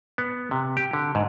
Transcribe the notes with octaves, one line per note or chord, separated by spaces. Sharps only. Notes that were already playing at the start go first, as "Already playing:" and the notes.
B3
C3
G4
D3
G#2